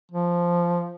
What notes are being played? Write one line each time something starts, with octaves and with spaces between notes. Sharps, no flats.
F3